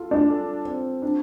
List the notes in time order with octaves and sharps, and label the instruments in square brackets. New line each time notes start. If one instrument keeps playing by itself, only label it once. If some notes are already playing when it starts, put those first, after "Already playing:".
Already playing: [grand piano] F4 A4
[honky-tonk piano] D4
[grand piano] A4
C4
D4